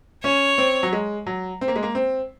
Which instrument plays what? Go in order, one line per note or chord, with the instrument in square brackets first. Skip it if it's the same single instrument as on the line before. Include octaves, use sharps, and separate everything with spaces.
[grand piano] C#4 [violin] C#5
[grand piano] C4
F#3
G#3
F#3
C4
A#3
G#3
A#3
C4